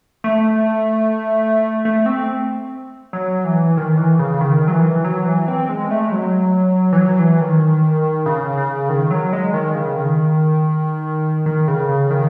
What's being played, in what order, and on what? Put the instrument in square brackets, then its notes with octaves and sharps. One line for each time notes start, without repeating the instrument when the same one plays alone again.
[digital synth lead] A3
A3
C4
F#3
E3
D#3
E3
C#3
C#3
D#3
F#3
E3
F#3
E3
C4
G#3
A3
G#3
F#3
E3
F#3
E3
D#3
C#3
C#3
D#3
F#3
G#3
D#3
C#3
D#3
D#3
C#3
C#3
D#3